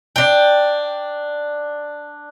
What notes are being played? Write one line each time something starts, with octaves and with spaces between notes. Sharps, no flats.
D4 G5